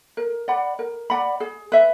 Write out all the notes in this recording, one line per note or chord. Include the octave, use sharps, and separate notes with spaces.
A#4
D5 F#5 B5
A#4
D5 F#5 B5
G#4
B4 E5